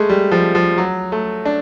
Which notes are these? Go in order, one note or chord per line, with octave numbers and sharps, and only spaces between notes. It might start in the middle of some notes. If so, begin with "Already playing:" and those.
Already playing: G#3 A3
G3
F3
F3
F#3
A3
D4